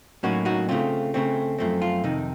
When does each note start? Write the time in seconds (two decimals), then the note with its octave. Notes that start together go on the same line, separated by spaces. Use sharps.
0.23 A2 F#3 A#3 C#4 D#4 F#4
0.45 D#4 F#4
0.69 C#3 A3 C4 F4
1.14 C#3 A3 C4
1.58 F#2 F3 A3 C4
1.82 F4
2.04 F2 C3 D#3 D#4